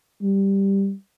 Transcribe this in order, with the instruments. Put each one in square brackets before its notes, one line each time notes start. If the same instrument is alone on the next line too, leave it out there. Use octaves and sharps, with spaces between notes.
[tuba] G3